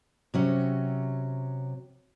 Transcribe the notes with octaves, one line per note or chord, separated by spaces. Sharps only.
C3 F#3 C#4